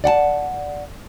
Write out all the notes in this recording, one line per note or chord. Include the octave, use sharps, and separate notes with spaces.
D5 F#5 G5 A5